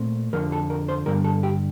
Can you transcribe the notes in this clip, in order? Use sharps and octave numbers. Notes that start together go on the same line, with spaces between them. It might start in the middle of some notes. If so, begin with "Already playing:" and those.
Already playing: A#2 A3 C4
F2 D3 F3 A#4
A4
A#4
C5
G2 D3 G3 A#4
A4
G4